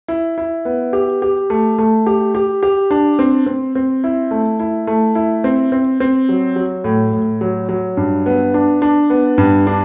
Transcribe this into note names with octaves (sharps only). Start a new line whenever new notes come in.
E4
E4
B3
G4
G4
A3
A3
G4
G4
G4
D4
C4
C4
C4
E4
A3
E4
A3
E4
C4
C4
C4
F#3
F#3
A2
A2
F#3
F#3
G2
B3
D4
D4
B3
G2
D4